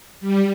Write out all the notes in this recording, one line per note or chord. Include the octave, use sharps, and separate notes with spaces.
G3